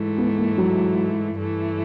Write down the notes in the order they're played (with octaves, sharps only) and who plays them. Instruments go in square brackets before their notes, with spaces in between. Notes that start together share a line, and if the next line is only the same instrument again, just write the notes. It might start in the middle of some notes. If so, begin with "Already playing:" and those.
Already playing: [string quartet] G#2 E3 A3
[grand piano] B3
A#3
F#3
[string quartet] G2 E3 A3